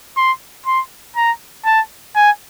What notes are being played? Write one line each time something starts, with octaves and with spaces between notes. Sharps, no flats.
C6
C6
A#5
A5
G#5